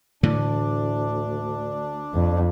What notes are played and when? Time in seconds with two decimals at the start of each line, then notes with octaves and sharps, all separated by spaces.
0.23 D2 A2 D3 E3 D4
2.14 F2